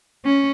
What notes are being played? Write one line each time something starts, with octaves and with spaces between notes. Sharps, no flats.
C#4